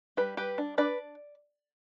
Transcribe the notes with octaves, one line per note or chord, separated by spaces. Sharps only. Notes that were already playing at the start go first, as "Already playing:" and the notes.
G3 G4 B4
G3 G4 B4
D4
D4 B4 D5